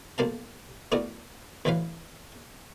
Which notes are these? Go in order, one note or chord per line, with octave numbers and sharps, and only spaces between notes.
B1 A#3 F5 A5
A3 B3 E4 F#4 A#4 D5
D2 E3 F#3 B4 F5